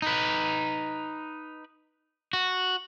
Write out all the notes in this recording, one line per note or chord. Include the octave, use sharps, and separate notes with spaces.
D#4 B4
F#4